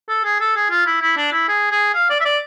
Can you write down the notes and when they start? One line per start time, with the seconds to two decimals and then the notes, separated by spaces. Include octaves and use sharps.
0.09 A4
0.25 G#4
0.40 A4
0.56 G#4
0.70 F4
0.86 E4
1.02 E4
1.17 D4
1.32 E4
1.48 G#4
1.71 G#4
1.94 F5
2.10 D5
2.20 E5
2.25 D5